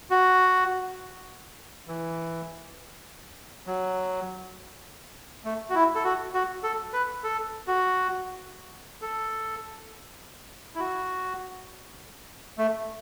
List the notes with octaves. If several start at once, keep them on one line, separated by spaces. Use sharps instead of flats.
F#4
E3
F#3
A3
F#4
E4
A4
F#4
F#4
A4
B4
A4
F#4
A4
E4
F#4
A3